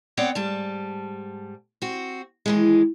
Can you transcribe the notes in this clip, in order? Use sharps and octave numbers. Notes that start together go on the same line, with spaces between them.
B3 C4 C#5 D5 F#5 G5
G#2 G3 A5
C4 F#4
D#2 E3 G#3